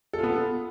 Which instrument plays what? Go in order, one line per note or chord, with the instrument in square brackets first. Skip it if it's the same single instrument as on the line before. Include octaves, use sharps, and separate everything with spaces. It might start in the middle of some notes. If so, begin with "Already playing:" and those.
[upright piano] A4
F4
B3